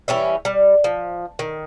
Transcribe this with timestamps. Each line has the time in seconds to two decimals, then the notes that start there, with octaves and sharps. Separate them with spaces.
0.08 E3 G3 C#4 E5
0.45 G3
0.84 F3
1.39 D#3